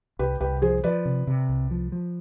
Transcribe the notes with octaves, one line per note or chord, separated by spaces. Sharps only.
C2 G4 B4
C2 G4 B4
F3 G#4 C5
F3 B4 D5
C3
C3
C2
F3
F3